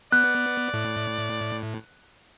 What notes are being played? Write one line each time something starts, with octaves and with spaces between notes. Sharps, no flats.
B3 D5 F#6
A2